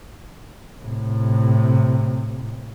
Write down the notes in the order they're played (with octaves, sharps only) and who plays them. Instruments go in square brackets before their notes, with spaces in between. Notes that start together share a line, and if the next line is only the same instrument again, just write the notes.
[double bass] A2 C3